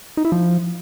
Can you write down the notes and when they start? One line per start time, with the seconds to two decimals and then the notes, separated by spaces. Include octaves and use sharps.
0.17 D#4
0.25 E4
0.32 F3